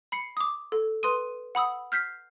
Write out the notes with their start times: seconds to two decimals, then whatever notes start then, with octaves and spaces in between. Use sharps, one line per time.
0.12 B5 C7 C#7
0.37 D6 D#6
0.72 A4
1.03 B4 C6 D#6 D#7
1.55 F#5 B5 D#6 E6
1.92 F6 G6 B6 C7